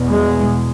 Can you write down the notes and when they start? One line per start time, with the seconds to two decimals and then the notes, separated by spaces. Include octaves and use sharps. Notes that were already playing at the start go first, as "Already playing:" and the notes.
Already playing: E2 B2
0.09 G#3